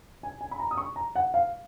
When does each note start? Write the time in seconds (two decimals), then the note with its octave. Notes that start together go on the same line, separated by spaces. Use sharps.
0.23 G#5
0.41 G#5
0.51 B5
0.60 A#5
0.71 D#6
0.77 C#6
0.96 A#5
1.15 F#5
1.34 F5